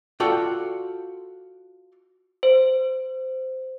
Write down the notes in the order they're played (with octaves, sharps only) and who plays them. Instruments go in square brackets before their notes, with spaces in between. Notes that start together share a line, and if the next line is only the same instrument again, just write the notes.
[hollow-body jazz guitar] F4 F#4 A4 D5 G5
[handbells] C5